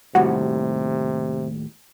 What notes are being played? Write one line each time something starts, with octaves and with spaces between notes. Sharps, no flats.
D#2 A2 C3 G3 F#4